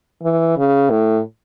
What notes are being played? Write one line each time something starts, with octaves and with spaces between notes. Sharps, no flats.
E3
C#3
A2